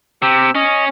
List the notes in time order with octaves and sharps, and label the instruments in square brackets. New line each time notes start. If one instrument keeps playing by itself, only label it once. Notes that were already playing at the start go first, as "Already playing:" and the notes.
[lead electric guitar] C3 [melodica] G4 E6
[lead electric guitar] C#4 [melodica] D#5